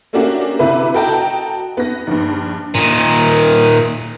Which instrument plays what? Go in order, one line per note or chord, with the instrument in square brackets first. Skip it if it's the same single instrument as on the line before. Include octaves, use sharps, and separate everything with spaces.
[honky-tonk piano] A3 A#3 C#4 D4 F#4 G4
C3 E4 B4
F#4 A4 D#5 G5 A5 A#5
B3 A#6
A#1 G2
[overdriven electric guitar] A#2 D#3